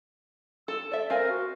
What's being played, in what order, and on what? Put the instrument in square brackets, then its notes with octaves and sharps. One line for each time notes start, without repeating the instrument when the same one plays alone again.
[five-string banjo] A4 [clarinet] E6
[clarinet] A4 [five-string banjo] D5 E5
[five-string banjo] C4 F5 G#5 [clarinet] A#4
[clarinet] F#4